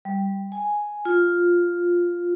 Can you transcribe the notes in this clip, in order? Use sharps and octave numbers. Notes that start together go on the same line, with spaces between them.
G3
G#5
F4